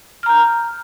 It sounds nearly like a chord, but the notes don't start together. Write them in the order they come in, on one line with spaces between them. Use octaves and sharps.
F6 A#5 G6